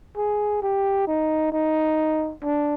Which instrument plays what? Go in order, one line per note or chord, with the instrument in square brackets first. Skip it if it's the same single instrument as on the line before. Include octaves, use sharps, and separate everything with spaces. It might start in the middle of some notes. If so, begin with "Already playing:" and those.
[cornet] G#4
G4
D#4
D#4
D4